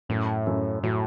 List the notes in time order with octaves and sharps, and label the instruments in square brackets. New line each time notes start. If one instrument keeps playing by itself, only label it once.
[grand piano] F#2 [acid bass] A2
[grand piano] F#2
[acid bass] A2 [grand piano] F#3